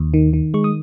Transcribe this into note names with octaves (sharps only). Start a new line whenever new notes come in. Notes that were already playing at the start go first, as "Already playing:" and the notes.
Already playing: D#2
D#3
D#3
G#3 C#6
D#6